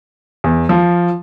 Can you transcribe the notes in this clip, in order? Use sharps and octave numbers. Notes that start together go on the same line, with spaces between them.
E2
F3